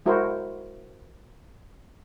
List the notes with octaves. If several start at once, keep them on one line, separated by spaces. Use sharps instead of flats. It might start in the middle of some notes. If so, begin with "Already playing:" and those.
G#3 E4 F#4 A#4 C5